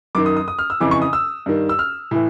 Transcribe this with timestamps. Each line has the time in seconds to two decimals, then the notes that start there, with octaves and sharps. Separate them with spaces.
0.15 F#2 D#3 D6
0.26 D#6
0.36 D#6
0.48 D#6
0.59 F6
0.70 E6
0.80 F2 C#3 E3 D6
0.91 C#6
1.02 D#6
1.13 E6
1.46 G2 D#3
1.69 E6
1.79 F6
2.11 A2 E3